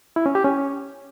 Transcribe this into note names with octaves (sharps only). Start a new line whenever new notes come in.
E4
C#4
G4
C#4